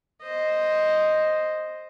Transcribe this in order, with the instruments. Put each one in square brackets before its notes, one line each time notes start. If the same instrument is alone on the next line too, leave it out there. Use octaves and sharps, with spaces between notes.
[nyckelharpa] C5 D#5